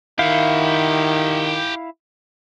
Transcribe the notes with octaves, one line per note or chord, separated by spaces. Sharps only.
D#3 E4 G4 F5 F#5